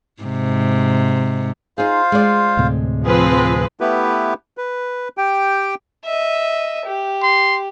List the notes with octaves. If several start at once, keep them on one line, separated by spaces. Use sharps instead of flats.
G#2 C3
D#4 F4 G#4 C5 F5
G#3 D5
D2 A2 C3
F3 C4 G#4 B4
A3 B3 E4 G4 B4
B4
G4 G5
D#5 E5
G4
C6